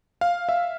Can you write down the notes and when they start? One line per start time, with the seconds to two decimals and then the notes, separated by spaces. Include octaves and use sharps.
0.21 F5
0.49 E5